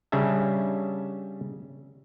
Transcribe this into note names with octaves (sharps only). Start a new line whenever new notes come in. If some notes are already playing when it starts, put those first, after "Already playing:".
C#3 G3 C#4 D4 E5